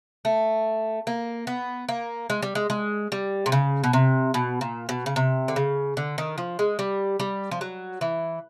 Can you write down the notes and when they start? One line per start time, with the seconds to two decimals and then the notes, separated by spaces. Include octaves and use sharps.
0.25 A3
1.07 A#3
1.47 B3
1.89 A#3
2.30 G#3
2.42 G3
2.55 G#3
2.70 G#3
3.12 G3
3.46 C3
3.52 C#3
3.84 B2
3.93 C3
4.34 B2
4.61 A#2
4.89 B2
5.06 C#3
5.16 C3
5.48 D3
5.56 C#3
5.97 D3
6.18 D#3
6.38 F3
6.59 G#3
6.79 G3
7.20 G3
7.51 F3
7.61 F#3
8.01 E3